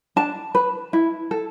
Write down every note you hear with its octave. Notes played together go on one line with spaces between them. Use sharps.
D4 A5
B4
E4
A4